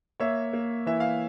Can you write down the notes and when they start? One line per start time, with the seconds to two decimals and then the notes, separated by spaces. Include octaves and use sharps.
0.20 A#3 C#5 E5
0.53 A#3
0.86 E3 E5
1.00 F5